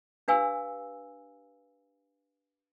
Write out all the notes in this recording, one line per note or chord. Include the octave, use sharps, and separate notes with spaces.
D4 G4 B4 F5 G#5 E6